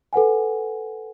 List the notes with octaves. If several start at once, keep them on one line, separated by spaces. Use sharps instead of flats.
A4 B4 F#5 G#5